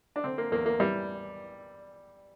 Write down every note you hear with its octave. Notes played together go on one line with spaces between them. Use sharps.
D4
D3 C4
A#3
E2 A#3
A#3
E3 G3